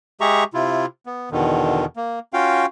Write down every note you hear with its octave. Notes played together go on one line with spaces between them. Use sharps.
G#3 G4 G#4 E5 A#5 C#6
C3 E4 F4
B3
E2 B2 D3 D#3
A#3
C#4 F4 F#4 F5 G5